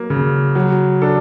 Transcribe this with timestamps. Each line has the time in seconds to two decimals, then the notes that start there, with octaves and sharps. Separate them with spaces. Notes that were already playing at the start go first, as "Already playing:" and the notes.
Already playing: F#3 A#3
0.10 C#3
0.55 F#3
1.02 D4 A4